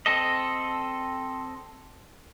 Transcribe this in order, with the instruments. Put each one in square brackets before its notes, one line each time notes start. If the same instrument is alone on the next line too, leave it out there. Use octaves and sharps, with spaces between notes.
[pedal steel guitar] C4 A4 D#5